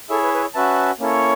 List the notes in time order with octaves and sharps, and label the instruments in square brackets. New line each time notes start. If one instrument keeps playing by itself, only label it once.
[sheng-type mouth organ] E4 G#4 C#5 E5 [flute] A4
[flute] B4
B4
[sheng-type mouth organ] C#4 F#4 B4 E5 A5
[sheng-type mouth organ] A#3 C#4 E4 A4 [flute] C#5